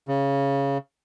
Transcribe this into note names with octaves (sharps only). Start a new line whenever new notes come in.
C#3